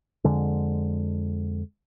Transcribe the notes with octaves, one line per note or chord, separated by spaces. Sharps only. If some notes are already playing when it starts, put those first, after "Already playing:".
F2 D3 G#3